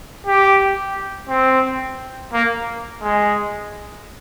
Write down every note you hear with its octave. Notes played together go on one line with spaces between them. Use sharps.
G4
C4
A#3
G#3